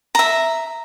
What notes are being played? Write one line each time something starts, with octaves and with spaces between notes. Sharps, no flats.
E5 A#5